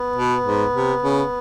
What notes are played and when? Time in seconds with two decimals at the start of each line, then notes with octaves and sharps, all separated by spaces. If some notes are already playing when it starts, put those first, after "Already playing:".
Already playing: B3
0.16 B2
0.45 G#2
0.73 C3
1.03 C#3